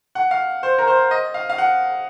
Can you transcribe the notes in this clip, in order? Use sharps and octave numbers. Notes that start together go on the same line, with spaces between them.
F#5
F5
C5
A#4
C5
D#5
F5
F5
F#5